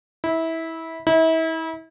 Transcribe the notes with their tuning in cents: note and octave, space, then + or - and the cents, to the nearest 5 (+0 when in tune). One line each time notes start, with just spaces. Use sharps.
E4 -20
E4 -35